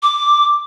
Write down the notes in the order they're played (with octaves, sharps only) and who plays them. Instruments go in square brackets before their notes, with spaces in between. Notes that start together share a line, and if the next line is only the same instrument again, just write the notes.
[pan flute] D6